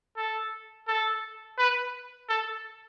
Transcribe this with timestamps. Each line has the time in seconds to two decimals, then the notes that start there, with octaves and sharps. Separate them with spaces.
0.17 A4
0.87 A4
1.58 B4
2.29 A4